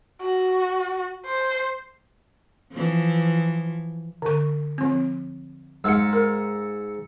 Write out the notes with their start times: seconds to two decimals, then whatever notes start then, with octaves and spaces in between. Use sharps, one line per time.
0.21 F#4
1.25 C5
2.72 E3 F3
4.22 D3 C#6
4.78 F3 C4
5.84 G#2 F5 C6 E6 C#7
6.13 A#4